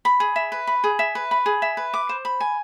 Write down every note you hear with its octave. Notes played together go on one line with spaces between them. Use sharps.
B5
G#4
E5
B4
B5
G#4
E5
B4
B5
G#4
E5
B4
D6
C5
B5
G#5